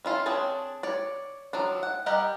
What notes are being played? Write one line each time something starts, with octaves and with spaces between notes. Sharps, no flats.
C#4 E4 F4
C4 D4 G#4 C#5 A5
C#5 D5
F3 F#3 D4
F#5
G3 G4 A#4 D#5 F#5